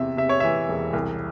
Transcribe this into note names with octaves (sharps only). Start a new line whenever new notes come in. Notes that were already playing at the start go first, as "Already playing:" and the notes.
Already playing: E2 C3 E5
C3 E5
C#5
E3 E5
E1
C2